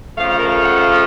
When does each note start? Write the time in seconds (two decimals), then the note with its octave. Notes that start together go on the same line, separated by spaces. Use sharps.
0.17 F2 C#3 F3 A3 F5
0.28 F5
0.38 A#4
0.48 F5
0.64 F#5
0.80 F5